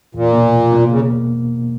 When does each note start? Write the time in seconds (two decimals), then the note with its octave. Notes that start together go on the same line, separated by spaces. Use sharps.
0.14 E2 A#2
0.33 B2 A#3 D4
0.53 E2
0.72 B2 A#3 D4
0.92 C#3